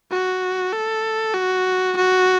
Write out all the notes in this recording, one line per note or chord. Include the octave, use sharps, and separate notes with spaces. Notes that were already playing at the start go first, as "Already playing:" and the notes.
F#4
A4
F#4
F#4